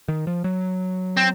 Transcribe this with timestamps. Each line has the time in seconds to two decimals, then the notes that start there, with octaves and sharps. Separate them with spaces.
0.08 D#3
0.27 F3
0.44 F#3
1.17 C4